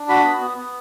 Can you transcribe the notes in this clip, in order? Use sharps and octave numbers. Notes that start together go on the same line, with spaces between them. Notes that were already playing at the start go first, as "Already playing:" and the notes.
Already playing: D4
F#4 B5
B3
B3
B3